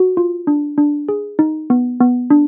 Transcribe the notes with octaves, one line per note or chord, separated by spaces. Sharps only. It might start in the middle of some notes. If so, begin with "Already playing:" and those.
Already playing: F#4
F4
D4
D4
G#4
D#4
B3
B3
D4